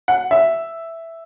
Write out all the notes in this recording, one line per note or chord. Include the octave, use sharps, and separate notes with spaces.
F#5
E5